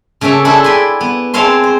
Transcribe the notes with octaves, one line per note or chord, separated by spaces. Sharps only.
C#3 A3 A#3 C#4 A4
D4 E4 G#4 A4 C5
G5 G#5 B5 C6
B3
G#3 C4 C#5 F5 A5 C6
C5